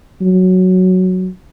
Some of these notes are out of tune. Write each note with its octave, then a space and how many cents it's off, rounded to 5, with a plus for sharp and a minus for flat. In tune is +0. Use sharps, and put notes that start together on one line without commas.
F#3 +0